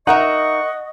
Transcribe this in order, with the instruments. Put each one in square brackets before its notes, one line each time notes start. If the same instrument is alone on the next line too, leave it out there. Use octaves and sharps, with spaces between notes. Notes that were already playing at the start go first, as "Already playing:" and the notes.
[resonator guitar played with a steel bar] D#4 A#4 E5 [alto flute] D#5 [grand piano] F#5 [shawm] C#6